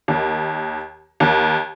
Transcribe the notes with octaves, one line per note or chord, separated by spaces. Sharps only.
D#2
D#2